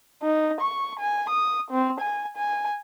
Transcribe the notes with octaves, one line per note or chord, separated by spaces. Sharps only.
D#4
C#6
G#5
D#6
C4
G#5
G#5